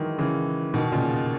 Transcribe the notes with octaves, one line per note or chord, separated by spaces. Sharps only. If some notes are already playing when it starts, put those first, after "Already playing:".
Already playing: D#3 E3 F#3 G#3
C#3 E3
B2 D#3
A#2 C#3